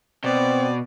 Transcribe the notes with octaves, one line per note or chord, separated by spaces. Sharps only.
B2 C4 D5